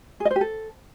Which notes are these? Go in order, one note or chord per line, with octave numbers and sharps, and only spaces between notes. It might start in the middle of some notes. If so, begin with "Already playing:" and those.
G#4
D#5
C5
G4
A4